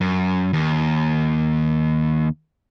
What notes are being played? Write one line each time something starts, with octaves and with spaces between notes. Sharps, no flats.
F#2
D#2